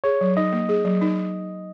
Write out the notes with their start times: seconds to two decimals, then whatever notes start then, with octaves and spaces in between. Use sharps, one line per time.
0.04 G#4 C#5
0.21 F#3
0.37 D#4 D#5
0.52 A#3
0.69 G#4
0.85 F#3
1.01 D#4